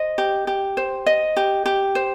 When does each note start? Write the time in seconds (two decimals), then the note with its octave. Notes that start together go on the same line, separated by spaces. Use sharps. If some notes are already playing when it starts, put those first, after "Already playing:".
Already playing: C5 D#5
0.18 G4
0.47 G4
0.77 C5
1.06 D#5
1.37 G4
1.66 G4
1.95 C5